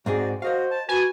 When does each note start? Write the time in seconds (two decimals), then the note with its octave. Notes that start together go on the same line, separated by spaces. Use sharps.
0.06 G#2 C4 F#4 G#4 D5
0.42 F#4 A#4 C5 D#5 F5
0.71 A5
0.89 F#4 B4 G#5 A5